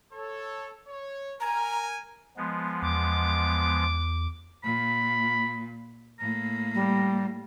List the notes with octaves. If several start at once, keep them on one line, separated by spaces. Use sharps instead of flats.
A4 C#5
C#5
A#4 G#5 A#5
F3 G#3 B3
E2 D6
A#2 B5
A2 A#3 A#5
G3